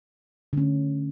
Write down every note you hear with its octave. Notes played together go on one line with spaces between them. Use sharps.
D3 A3 C#4